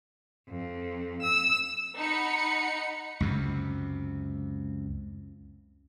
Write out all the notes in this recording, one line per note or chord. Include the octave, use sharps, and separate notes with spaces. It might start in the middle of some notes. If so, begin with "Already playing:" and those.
F2
E6
D#4 F#5 B5 C#7
C#2 F#2 C3